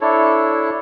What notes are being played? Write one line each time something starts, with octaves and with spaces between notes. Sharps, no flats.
D4 E4 A4 C#5